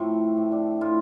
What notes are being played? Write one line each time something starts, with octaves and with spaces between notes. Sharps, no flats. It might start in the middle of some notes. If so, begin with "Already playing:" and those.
Already playing: A2 F3 A3 C4
A2
D4
A2 F4